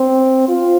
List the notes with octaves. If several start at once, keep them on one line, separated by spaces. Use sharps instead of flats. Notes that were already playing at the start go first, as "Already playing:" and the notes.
Already playing: C4
F4